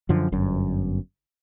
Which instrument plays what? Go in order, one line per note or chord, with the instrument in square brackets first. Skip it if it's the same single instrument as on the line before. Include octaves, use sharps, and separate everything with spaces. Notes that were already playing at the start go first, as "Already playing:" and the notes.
[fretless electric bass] F#2 D3 F3
G1 F#2